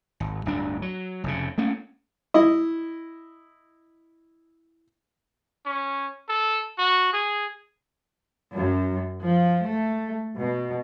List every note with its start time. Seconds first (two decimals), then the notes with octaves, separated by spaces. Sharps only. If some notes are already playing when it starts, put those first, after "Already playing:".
0.20 G#1
0.45 D1 G2 D4
0.82 F#3
1.24 F1 F2 C#3
1.58 A3 A#3 C#4
2.34 E4 D#5
5.66 C#4
6.29 A4
6.78 F#4
7.13 G#4
8.53 F#2
9.22 F3
9.65 A3
10.37 B2